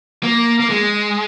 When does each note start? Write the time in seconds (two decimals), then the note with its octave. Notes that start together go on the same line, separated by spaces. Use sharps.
0.23 A#3
0.60 A#3
0.70 G#3